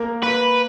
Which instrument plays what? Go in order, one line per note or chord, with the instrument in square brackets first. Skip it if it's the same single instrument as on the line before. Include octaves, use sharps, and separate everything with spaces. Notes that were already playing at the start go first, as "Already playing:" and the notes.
Already playing: [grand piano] A#3 A#4
[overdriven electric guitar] B4